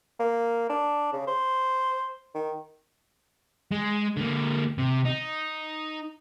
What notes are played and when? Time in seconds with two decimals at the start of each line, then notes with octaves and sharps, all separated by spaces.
0.20 A#3
0.70 D4
1.13 C#3
1.27 C5
2.35 D#3
3.72 G#3
4.17 D3 A#3
4.78 C3
5.05 D#4